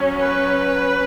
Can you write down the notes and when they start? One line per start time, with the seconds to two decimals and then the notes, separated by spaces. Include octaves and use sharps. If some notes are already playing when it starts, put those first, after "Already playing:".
Already playing: F#3 C#4
0.19 B4